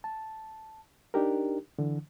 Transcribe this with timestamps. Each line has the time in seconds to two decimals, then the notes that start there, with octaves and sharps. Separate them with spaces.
0.04 A5
1.14 D4 D#4 G4 A#4
1.79 D3 E3